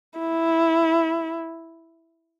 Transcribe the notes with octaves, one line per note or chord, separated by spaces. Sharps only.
E4